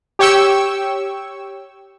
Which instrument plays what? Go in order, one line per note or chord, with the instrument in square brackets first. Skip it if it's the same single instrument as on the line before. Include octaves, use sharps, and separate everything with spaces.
[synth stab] G4 C#5 G5 C#6 E6